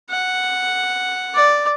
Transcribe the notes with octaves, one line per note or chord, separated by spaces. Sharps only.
F#5
D5